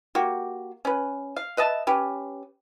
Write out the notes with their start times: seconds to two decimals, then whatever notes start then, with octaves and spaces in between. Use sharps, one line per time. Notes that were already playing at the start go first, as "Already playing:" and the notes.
0.15 A#3 F#4 G4
0.85 C#4 B4
1.36 F5
1.57 B4 D#5 E5 A5
1.87 C#4 G4 B4